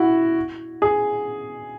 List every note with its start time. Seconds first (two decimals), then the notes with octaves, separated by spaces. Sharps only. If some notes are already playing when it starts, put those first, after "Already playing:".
Already playing: E4 F#4
0.82 G#4